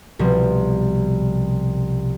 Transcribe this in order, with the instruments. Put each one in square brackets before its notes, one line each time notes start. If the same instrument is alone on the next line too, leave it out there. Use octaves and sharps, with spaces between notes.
[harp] C2 B2 F3